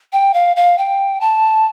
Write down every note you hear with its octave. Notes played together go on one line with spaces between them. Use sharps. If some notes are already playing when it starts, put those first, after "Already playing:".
G5
F5
F5
G5
A5